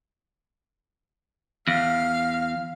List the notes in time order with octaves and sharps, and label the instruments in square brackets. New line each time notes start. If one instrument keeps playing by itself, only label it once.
[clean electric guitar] E2 [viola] F5